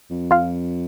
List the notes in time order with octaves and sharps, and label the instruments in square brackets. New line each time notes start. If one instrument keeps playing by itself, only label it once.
[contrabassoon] F2
[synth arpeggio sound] F4 F5